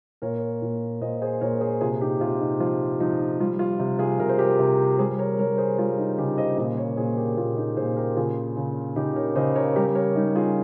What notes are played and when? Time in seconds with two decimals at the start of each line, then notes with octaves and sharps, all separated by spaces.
0.22 A#2 A#4 C#5
0.62 A#2
1.01 A#2 C5 D#5
1.22 G#4 C5
1.41 A#2 A#4 C#5
1.61 G#4 C5
1.81 C3 F4 G#4
2.01 D#4 G4
2.21 C3 F4
2.40 D#4
2.60 F3 F4
3.00 F3 D#4
3.40 G3 F4
3.59 F4
3.79 C3
3.99 F4 G#4
4.19 C3 A#4
4.29 C5
4.39 G4 A#4
4.59 C3
4.98 G3 G#4 C5
5.19 A#4 C#5
5.38 G3 A#4 C#5
5.58 G#4 C5
5.78 G3 F4
5.98 D#4
6.18 C#3 D#4 G4
6.38 C5 D#5
6.58 A#2 C5 D#5
6.77 A#4 C#5
6.97 A#2 G#4 C5
7.17 G4 A#4
7.37 A#2 F4 G#4
7.57 D#4 G4
7.76 A#2 G#4 C5
7.96 G4 A#4
8.16 C#3 F4 G#4
8.57 C#3
8.96 C#3 D#4 G4
9.16 A#4 C#5
9.35 C#3 C5 D#5
9.56 A#4 C#5
9.76 G3 G4 A#4
9.95 A#4 C#5
10.15 G3 D#4
10.36 F4 G#4